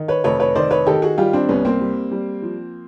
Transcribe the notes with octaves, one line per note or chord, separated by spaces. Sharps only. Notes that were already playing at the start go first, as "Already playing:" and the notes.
Already playing: D#3
B4 C#5
F1 B4 C#5
B4 C#5
D#3 C5 D5
B4 C#5
D#3 G4 A4
F#4 G#4
G3 F4 G4
C4 D4
C2 B3 C#4
A#3 C4
G3
G3
F3